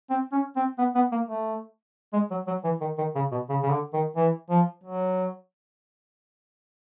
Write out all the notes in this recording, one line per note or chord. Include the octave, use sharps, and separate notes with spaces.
C4
C#4
C4
B3
B3
A#3
A3
G#3
F#3
F#3
E3
D#3
D#3
C#3
B2
C#3
C#3
D3
D#3
E3
F3
F#3